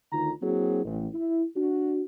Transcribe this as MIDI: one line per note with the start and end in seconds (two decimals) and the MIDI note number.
0.12 0.31 38
0.12 0.31 50
0.12 0.31 51
0.12 0.31 63
0.12 0.31 65
0.12 0.31 82
0.42 0.84 54
0.42 0.84 58
0.42 0.84 60
0.42 0.84 64
0.42 0.84 66
0.42 0.84 68
0.85 1.06 33
1.14 1.43 64
1.56 2.02 62
1.56 2.02 66